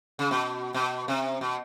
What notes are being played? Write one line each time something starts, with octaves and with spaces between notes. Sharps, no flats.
C#3
B2
B2
C3
B2